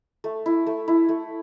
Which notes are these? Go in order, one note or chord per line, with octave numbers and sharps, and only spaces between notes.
A3
E4
A3
E4
A3